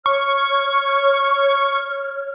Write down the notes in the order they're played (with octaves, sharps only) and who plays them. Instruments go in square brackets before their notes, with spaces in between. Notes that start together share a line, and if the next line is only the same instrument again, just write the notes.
[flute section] C#5 F6 [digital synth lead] C#6